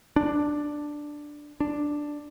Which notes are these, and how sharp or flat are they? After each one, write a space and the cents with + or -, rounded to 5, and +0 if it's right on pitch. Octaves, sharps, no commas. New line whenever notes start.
D4 +5
D4 +5